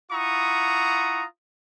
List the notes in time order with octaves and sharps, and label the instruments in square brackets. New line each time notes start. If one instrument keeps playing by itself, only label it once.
[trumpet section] E4 F4 F#5 A#5 C#6 D#6